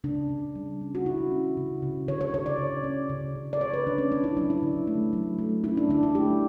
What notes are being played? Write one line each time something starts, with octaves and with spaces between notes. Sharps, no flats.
C#3 D4
C#3
G3
C#4
F#4
C#3 E4
C#4
C#3
C#3
D3 C#5
C#5
D3 C#5
D5
C#3
C#4
C#3
C#3
D5
D3 C#5
B4
D3 D4
C#4
C#4 D4
E4
F#3 D4
E4
D3
A3
F#3
A3
C#4 E4
D4
D3 D4
E4
A3 G4